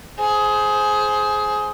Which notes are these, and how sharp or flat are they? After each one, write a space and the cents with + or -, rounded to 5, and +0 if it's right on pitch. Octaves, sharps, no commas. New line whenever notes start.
G#4 +20 C5 +0